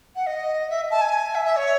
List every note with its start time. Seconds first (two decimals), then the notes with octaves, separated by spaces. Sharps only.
0.15 F#5
0.26 D#5
0.69 E5
0.90 A5
1.01 G#5
1.34 E5
1.45 E5
1.56 C#5